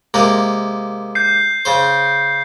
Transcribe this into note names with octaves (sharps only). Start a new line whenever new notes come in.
C3 G#3 A#3
G6 C7
C#3 C5